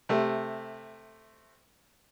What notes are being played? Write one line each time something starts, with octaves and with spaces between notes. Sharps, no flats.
C3 A3